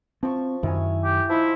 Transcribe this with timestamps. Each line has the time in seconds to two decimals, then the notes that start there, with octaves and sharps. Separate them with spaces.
0.23 F3 C4 C#6
0.63 F#2 D#3 E4 C#5 G#5
1.04 G4
1.29 F3 D#4 E4 C6